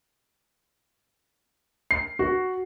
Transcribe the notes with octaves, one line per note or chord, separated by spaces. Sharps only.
C7
F#4